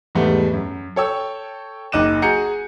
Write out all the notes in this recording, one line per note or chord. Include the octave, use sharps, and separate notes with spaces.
E2 G#2 G3 A3 B3
F#2
A4 C#5 G5 E6
F#1 D#4 D6 F#6 D#7 E7
F#4 G#4 A#5 G6 C#7